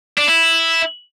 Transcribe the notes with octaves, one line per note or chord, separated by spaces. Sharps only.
D4
E4